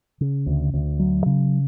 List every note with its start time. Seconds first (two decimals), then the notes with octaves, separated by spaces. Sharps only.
0.21 C#3
0.46 D2
0.74 D2
1.00 F#3
1.26 C#3